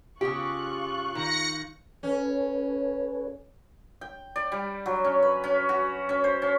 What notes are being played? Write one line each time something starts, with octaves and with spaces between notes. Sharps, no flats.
C#3 F4 G4 C#6 F#6
D#3 A#6 C#7
C#4 A4 B4 C#5
G5
D5
G3
F#3
C#4
B4
C#4
F#4
C#4
C5
C#4